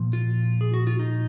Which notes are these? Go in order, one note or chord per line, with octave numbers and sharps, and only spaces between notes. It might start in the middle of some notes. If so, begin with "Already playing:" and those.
Already playing: A#2 F3
F4
G#4
F#4
F4
D#4